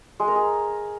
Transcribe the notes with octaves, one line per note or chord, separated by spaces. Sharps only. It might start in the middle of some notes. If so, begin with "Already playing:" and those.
G#3
A#4
G#4